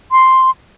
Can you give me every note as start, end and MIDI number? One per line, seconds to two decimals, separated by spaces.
0.12 0.50 84